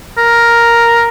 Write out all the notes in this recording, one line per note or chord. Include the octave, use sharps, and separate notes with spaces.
A#4